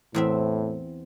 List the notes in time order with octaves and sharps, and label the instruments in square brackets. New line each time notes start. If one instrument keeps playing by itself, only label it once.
[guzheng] E2 C4 E5 [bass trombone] A2